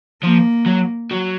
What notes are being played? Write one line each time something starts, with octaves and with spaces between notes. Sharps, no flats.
F3 A#3
F#3
F#3